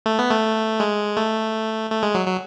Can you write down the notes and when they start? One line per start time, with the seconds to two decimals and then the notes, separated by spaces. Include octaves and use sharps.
0.06 A3
0.19 B3
0.31 A3
0.80 G#3
1.17 A3
1.90 A3
2.03 G#3
2.14 F#3
2.27 F#3